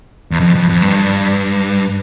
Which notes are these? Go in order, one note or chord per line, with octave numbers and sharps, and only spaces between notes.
E2
F2
F2
F2
G2